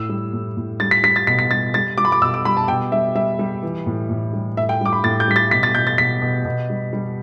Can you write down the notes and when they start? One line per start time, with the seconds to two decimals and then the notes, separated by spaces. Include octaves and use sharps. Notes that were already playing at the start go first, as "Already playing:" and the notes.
Already playing: A2 E6
0.09 G3
0.33 A2
0.57 A2
0.80 G3 A6
0.91 B6
1.04 G3 B6
1.16 A6
1.27 B2 B6
1.39 B6
1.51 G3 A6
1.74 G3 A6
1.98 G3 D6
2.05 B5
2.12 D6
2.22 B2 E6
2.34 D6
2.45 G3 B5
2.57 A5
2.68 B2 G5
2.92 G3 E5
3.15 G3 E5
3.39 G3
3.63 E3
3.86 A2
4.10 A2
4.33 G3
4.57 A2 E5
4.69 G5
4.81 G3 D6
4.93 B5
5.04 A2 A6
5.20 G6
5.28 G3 B6
5.36 A6
5.51 B2 B6
5.63 A6
5.75 B2 G6
5.87 A6
5.98 B2 B6
6.22 B2
6.45 B2
6.70 G3
6.93 G3